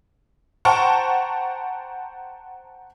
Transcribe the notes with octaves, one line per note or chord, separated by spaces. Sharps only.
C5 F#5 G5 A5 A#5 C#6